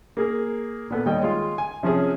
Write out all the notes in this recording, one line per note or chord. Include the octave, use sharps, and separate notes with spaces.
A#3 G#4 A#4
A#2 B3 A4
D#2 G3 C#5 D#5 G5
G#3 F4
G#5
C3 F3 C#4 G#4